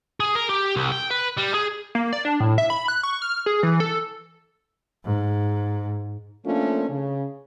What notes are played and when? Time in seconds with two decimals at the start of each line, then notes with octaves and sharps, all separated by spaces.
0.20 G#4
0.35 A#4
0.50 G4
0.76 C2
0.92 G5
1.10 B4
1.37 G3
1.54 G#4
1.95 A#3
2.13 D5
2.25 D4
2.40 A2
2.58 E5
2.70 B5
2.88 F#6
3.03 C#6
3.22 F6
3.46 G#4
3.63 E3
3.80 A4
5.05 G#2
6.45 F3 A3 A#3 C#4 D4 F4
6.90 C#3